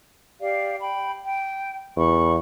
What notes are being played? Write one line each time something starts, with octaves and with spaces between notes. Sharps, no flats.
G4 D5 F5
G5 B5
G5
E2 B5 C#6